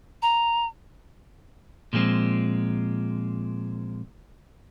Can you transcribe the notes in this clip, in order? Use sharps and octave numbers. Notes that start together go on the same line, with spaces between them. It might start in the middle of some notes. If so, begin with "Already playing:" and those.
A#5
A#2 F3 G#3 C4